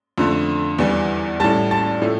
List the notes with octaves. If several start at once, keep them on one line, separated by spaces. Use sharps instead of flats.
F2 D3 A3
E2 E3 G3
A2 G3 A5 A6
A5 A6
A2 F3 A3